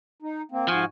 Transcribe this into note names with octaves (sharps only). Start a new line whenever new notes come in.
D#4
A#3 C4
G#2 F3 F#4 G#5